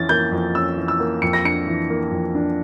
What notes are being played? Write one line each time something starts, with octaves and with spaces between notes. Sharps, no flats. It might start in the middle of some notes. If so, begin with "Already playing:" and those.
Already playing: F2 E3 C#4 A6
A#3 G6
F2
C#4 E6
E3
E6
A#3
F2 C#7
A#6
D4 C#7
E3
A#3
F2
D4